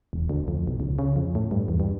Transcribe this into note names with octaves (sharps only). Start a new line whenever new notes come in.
E1
D2
F2
B1
C#2
C#3
F2
A2
G2
E2
G2